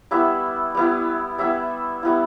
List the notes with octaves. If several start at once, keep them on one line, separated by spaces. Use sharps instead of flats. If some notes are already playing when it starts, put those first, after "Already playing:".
G3 B3 E4 E5
G3 B3 E4
G3 B3 E4 E5
G3 B3 E4